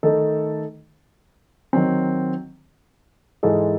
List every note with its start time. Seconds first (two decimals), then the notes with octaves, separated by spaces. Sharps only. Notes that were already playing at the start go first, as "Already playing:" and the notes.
0.03 D#3 A3 D#4 A4
1.73 D#3 F#3 C4
3.43 G#2 E3 G#3 D#4 A4